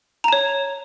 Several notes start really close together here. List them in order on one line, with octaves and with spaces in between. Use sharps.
A#5 A5 C#5